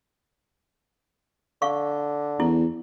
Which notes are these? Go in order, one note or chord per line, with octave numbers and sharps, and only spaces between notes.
D3 F5 C#6
E2 E4